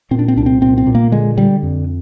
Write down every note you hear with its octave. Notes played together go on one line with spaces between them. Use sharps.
A#2 C4
D4
C4
C2 D4
C4
A#2 C4
C4
A#2
A#3
D3 G#3
D3 G3
F2